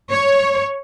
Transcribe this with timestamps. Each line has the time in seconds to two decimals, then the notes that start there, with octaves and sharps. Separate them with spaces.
0.11 C#5